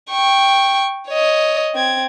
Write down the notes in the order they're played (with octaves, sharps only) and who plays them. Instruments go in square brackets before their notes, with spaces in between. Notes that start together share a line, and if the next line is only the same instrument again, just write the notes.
[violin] G5 C#6
C#5 D#5
C4 G#6